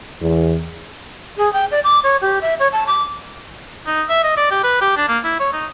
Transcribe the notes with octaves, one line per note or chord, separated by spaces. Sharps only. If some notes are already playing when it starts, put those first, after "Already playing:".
E2
G#4
G5
D5
D6
C#5
G4
E5
C#5
A5
D6
D#4
E5
D#5
D5
G4
B4
G4
D4
A#3
E4
C#5
D#4